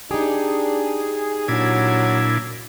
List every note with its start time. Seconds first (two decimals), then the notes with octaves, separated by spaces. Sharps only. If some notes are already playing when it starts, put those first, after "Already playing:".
0.11 D4 D#4 G4 G#4
1.48 A#2 F#3 D4 E4 G#6